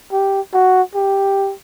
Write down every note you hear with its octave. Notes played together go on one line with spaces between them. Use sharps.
G4
F#4
G4